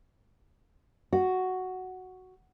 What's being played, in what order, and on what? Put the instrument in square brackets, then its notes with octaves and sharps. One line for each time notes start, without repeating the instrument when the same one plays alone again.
[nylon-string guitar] F#4